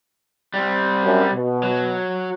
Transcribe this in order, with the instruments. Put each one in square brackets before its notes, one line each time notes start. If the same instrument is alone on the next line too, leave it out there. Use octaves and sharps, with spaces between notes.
[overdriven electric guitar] G3 C4
[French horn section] F#2
B2
[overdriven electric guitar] F#3